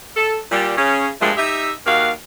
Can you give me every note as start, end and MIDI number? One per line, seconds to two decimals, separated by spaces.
0.17 0.37 69
0.51 0.74 46
0.51 0.74 55
0.77 1.08 49
0.77 1.08 61
1.21 1.31 43
1.21 1.31 46
1.21 1.31 53
1.21 1.31 56
1.21 1.31 57
1.37 1.72 63
1.37 1.72 67
1.37 1.72 76
1.86 2.11 39
1.86 2.11 58
1.86 2.11 66
1.86 2.11 70
1.86 2.11 77